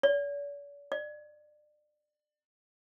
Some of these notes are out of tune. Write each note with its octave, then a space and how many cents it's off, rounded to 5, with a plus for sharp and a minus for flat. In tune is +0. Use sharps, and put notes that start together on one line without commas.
D5 -45
D5 +35